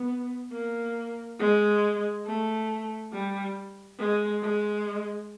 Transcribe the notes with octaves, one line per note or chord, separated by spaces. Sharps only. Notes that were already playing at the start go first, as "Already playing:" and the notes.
Already playing: B3
A#3
G#3
A3
G3
G#3
G#3